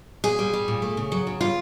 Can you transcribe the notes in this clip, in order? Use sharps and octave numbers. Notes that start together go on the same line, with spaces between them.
A#2 G#4
G3
G3
A#2
A3
C#3
F#3
C#3
G3 F4